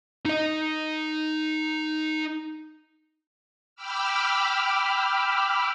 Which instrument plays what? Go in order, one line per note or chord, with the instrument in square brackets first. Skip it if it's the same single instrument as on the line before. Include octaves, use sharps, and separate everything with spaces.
[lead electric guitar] D#4 D#5
[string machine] G5 B5 D6 E6 F6